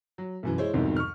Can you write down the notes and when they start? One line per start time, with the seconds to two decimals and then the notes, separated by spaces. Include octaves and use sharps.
0.18 F#3
0.43 B1 F#2 E3
0.58 G#3 E4 C5 C#5
0.74 C2 F2 G#2 B2 D#3
0.96 C#6 F6